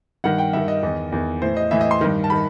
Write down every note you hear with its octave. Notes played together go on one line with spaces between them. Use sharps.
G2 D#3 F#5
G5
G2 D#3 E5
D#5
E2 D#3
E2 D#3
A2 E3 C5
D#5
A2 E3 E5
D#5
C6
G2 D#3
A5
D#3 B5